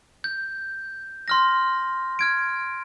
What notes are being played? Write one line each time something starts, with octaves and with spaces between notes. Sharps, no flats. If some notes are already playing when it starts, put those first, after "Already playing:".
G6
C6 F6 A#6
F6 G#6 D7